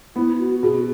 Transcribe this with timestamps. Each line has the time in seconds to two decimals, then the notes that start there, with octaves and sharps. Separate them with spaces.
0.16 B3 E4
0.39 F#4
0.63 B2 G#4